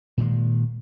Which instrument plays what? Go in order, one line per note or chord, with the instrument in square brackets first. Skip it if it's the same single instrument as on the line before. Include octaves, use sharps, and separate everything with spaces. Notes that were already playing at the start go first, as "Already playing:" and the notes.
[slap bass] A#2 D#3 G#3